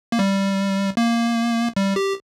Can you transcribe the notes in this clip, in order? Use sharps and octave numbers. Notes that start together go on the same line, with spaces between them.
A#3
G3
A#3
G3
G4